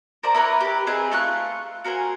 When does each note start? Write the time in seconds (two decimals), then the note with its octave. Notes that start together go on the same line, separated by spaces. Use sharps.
0.23 A#4 C5 D5 A#5
0.35 E4 A#4 B4 C#5
0.60 G4 B4
0.87 C4 D#4 G#4 B4
1.12 A3 F4 C#6 F#6
1.84 F#4 A#4 C5 G#5